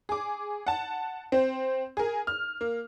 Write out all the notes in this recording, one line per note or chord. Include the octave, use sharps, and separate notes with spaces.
G#4 D6
F#5 A5
C4 C5
G#4 A#4
F6
A#3